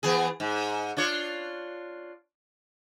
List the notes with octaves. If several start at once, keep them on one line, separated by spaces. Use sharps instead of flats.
E3 B3 G#4
G#2
D4 F4 C#5